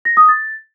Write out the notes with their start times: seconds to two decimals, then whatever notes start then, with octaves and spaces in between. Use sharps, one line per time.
0.05 A#6
0.17 D#6
0.29 A6